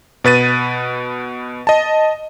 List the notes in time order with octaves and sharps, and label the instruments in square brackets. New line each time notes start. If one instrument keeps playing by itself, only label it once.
[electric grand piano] B2 B4 A6 D#7
D#5 A5